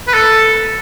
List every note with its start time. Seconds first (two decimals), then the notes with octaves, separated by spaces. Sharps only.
0.08 B4
0.14 A4